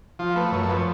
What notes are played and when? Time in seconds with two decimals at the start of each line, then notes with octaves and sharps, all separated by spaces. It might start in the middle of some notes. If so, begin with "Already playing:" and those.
0.19 F3 F4
0.36 A3 B4
0.52 F#2 C#5
0.63 A4
0.69 F3 B4
0.77 C#5